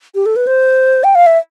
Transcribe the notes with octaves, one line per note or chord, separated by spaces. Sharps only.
G4
A4
B4
C5
G5
F5
E5